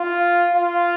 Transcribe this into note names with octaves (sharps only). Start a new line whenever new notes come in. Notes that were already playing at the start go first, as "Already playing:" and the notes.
Already playing: F4
F4